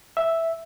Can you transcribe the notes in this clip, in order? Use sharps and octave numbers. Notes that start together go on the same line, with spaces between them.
E5